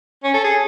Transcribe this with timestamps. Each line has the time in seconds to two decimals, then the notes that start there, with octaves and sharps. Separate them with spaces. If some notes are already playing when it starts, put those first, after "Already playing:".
0.24 C#4
0.34 A4
0.44 G#4